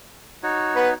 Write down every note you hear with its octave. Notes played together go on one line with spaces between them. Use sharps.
D#4 F#4 C#5
B3 B4